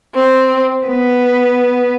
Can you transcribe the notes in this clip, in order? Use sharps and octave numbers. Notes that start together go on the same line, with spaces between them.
C4
B3